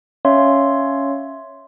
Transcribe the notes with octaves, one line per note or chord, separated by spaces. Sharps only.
C#4 C#5 E5 F5 C6